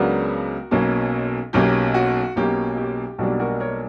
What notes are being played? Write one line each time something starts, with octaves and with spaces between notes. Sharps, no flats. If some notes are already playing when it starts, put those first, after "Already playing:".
Already playing: C#2 C#3 F#3 B3 D4 F#4 A#4
B1 B2 A#3 C#4
B1 B2 A#3 C#4 G4
F#4
B1 B2 A#3 C#4 G4
G4
B1 B2 G3 A#3 D4 F#4
F#4 A#4
A#4 C#5